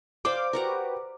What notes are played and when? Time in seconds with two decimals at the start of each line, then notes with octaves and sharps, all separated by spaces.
0.25 C5 D5 F5 G5 D6
0.53 F#4 G4 A#4 B4 F#5 A#5